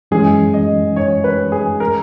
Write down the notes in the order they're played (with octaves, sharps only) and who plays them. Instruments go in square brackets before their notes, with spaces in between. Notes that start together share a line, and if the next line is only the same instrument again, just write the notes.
[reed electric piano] F#2 E3 G#3 C#4 [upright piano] G#4
[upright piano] D#5
C#5
B4
G#4
A#4